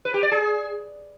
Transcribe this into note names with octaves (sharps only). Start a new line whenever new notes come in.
B4
G4
D5
G#4